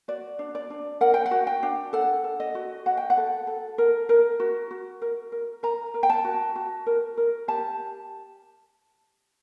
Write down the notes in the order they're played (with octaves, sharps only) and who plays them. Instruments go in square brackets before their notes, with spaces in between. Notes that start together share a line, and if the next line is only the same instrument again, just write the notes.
[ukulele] F#4 D5
D4
D5
D4
A#4 F#5
G5
F#5
F#4
G5
D4
A4 F#5
A4
D#5
F#4
F#4 F#5
G5
F#5
A4
A4
A#4
A#4
F#4
F#4
A#4
A#4
A#4 A#5
A#4
G5
A5
F#4
F#4
A#4
A#4
G4 A5